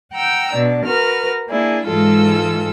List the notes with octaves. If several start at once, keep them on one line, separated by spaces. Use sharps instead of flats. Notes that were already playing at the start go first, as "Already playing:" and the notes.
F#5 G5 A#5 E6
B2 D4
F#4 A#4 B4 F6
A#3 D4 E4 G#4
G#2 E3 G#3 F4 A4 E6